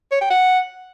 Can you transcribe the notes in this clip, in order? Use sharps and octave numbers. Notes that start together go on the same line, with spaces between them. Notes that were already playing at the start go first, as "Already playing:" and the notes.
C#5
G5
F#5